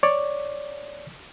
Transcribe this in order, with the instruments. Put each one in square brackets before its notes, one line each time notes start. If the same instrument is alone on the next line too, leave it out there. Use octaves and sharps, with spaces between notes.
[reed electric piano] C#5 D5